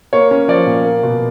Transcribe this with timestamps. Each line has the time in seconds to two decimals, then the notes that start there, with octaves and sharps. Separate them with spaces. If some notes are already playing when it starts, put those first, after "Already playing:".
0.13 A#3 C#5
0.31 C#4
0.48 F3 D5
0.66 A#2
0.85 A#3
1.03 B2